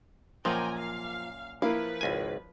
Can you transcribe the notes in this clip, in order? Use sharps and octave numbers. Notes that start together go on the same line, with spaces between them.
F#2 A#2 F3 A#3 G5 G#5 A#5
F5
F3 A#3 E4 B4 F5
G#1 C#2 G#5